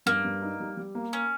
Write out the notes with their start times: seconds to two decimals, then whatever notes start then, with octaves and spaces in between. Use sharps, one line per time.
0.06 G2 A#3
0.25 G2
0.42 D#4
0.60 G3
0.77 G3
0.95 A#3
1.13 C#4